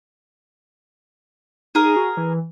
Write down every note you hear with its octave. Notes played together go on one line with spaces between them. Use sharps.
D#4 G#4 A#4
F#4
E3